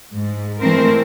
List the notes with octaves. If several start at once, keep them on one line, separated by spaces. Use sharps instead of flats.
G#2
E3 G#3 A3 C4 A#4 C5